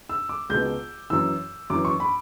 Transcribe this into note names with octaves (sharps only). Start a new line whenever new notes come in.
E6
D6
C#2 B2 G6
F#2 E3 E6
F#2 E3 D6
C#6
B5